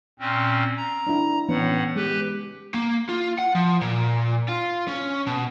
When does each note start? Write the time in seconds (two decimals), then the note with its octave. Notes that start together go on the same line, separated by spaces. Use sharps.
0.19 A#2 C4 C#4
0.77 A#5
1.07 D4 E4
1.49 A2 E3 B3 C#4 F#5
1.96 G#3 G4 B4
2.74 A#3
3.09 F4
3.38 F#5
3.55 F3
3.81 A#2
4.49 F4
4.88 C#4
5.26 B2